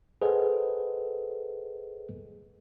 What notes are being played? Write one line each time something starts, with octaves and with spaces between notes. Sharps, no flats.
G#4 A4 B4 C5 D#5 F#5